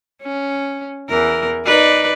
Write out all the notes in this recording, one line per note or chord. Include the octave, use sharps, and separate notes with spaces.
C#4
E2 E3 A#4
D#4 B4 D5